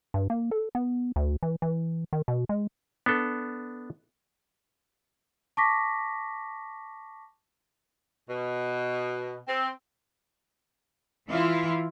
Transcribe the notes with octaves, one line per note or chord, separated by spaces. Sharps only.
G2
A#3
A4
B3
D2
E3
E3
D#3
B2
G#3
B3 D4 A4
A5 C#6 D6 A#6 B6
B2
C4
E3 E4 F4